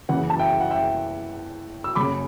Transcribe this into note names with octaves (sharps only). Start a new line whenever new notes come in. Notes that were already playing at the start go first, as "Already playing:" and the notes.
F#1 F#2 C#3 E3 F#5
A5
E5 G5
F#5
E5 G5
E6
F#1 F#2 C#3 B5 D6